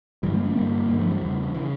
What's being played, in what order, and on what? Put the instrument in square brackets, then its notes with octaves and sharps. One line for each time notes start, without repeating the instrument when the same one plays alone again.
[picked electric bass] G2 D3 E3 G3
G3 A#3
A3 C#4
G2 D3 G3 A#3
G2 D3 G3 A#3
F3 A3
E3 G3
E2 C#3
C#3 E3